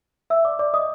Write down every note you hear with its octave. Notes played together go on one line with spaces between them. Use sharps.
E5 E6
D5 D6
D5 D6
D#5 D#6